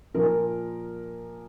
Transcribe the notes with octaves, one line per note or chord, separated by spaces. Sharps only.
A#2 F3 A#4